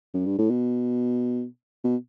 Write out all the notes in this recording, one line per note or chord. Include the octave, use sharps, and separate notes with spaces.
F#2
G2
A2
B2
B2